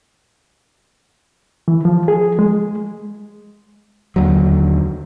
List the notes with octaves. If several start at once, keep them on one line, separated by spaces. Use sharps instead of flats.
E3
F3
G#4
G#3
D#2 D3 F#3